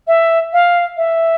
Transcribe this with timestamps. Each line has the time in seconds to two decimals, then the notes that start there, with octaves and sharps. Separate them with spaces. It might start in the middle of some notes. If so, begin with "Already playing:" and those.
0.07 E5
0.53 F5
0.97 E5